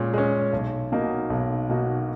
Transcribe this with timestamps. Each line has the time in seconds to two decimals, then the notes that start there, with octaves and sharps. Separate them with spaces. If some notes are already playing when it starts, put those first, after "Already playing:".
Already playing: A#2 G#3 C#4
0.14 G#3 C#4
0.53 B1
0.92 B2 A#3 D#4 F#4
1.30 B1
1.69 B2 A#3 D#4 F#4